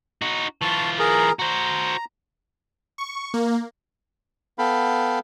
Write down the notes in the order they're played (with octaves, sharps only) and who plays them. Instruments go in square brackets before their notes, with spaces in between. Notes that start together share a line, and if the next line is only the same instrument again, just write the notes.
[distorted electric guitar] D#4 F#4
[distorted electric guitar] E3 F4 [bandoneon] A5 C#6
[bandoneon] G#4 A#4 A#5
[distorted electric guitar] F#4 C5 [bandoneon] A#5
[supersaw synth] C#6
A#3
[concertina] B3 A4 F5 G5 B5